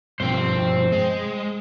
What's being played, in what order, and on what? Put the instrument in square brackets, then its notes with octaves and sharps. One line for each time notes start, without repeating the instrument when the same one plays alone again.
[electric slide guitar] G2 B2 F3 [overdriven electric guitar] C5 G5
[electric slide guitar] G#3